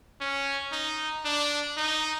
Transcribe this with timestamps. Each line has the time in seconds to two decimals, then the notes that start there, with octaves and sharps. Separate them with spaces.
0.21 C#4
0.72 D#4
1.25 D4
1.77 D#4